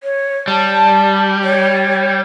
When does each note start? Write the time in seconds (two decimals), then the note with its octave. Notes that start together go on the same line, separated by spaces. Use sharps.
0.03 C#5
0.48 G3 A5
1.43 C#5